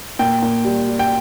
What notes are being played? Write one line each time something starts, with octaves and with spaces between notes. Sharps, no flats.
A#2 G5
A#2
G3
G3
G5